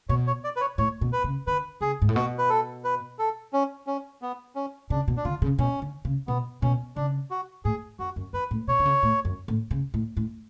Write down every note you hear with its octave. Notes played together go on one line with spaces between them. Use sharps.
B2 C#5
C#5
D5
B4
C#5
A2 C#5
B2
B4
C#3
D3 B4
C#3 G#4
G#2
A2
B2 F#4
B4
A4
B4
A4
C#4
C#4
B3
C#4
C#3 D4
B2
D4
D3 F4
C#3
B2 C#4
D3
C#3
B2 B3
B2 C#4
C#3 D4
F#4
A2 G#4
F#2 F#4
F#2
F#2 B4
A2
B2 C#5
D3
C#3
A2
F#2
A2
C#3
A2
A2